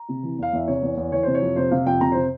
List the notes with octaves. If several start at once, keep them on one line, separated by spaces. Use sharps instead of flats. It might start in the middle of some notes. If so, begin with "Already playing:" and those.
Already playing: A#5
C3
E3
E2 F5
E2 E5
C3 C#5
E2
E2
E3 C#5
C3 C5
C#5
F2
C3 C5
C3 F5
F2 G5
C3 A#5
C3 C5